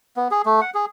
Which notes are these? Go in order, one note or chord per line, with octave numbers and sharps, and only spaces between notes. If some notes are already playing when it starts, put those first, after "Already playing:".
B3
G#4
A3
F#5
G#4